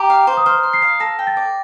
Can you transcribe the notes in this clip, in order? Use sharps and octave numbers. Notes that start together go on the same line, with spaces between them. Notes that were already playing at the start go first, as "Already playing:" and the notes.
Already playing: G4 A#5
F5
C5
D#6
C5 F6
C6
C7
F5
A4 A#6
G5
A6
D5